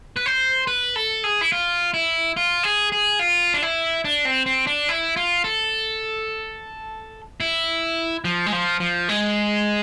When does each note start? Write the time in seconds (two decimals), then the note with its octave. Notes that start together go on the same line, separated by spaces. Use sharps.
0.17 B4
0.26 C5
0.67 B4
0.96 A4
1.24 G#4
1.41 E4
1.52 F4
1.94 E4
2.37 F4
2.63 G#4
2.92 G#4
3.19 F4
3.54 D4
3.62 E4
4.05 D4
4.25 C4
4.46 C4
4.67 D4
4.89 E4
5.17 F4
5.44 A4
7.40 E4
8.25 F3
8.46 G#3
8.52 F3
8.80 F3
9.09 G#3